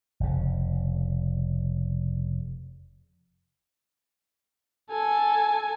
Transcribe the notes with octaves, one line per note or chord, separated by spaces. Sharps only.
F1 C#3
A4 G#5